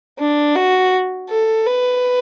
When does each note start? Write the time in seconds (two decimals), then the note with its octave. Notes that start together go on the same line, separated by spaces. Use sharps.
0.19 D4
0.55 F#4
1.30 A4
1.66 B4